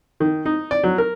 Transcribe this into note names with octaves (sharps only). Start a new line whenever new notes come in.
D#3
D#4
D5
F#3
A#4